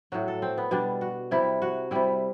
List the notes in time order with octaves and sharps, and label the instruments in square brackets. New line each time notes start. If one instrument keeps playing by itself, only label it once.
[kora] A2 F#3 F#4
A4
C4
B3
B2 G3 D4
F#4
C3 G3 E4
F#4
C3 G3 E4